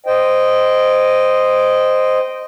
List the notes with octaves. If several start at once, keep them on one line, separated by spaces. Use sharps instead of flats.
C5 D#5 G5